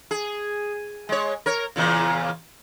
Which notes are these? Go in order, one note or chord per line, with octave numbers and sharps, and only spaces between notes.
G#4
G#3 C#5
A#4 C#5
E2 A#2 C#3